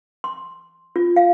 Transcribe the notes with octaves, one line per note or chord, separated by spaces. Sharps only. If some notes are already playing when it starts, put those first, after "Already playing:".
C6
F4
F5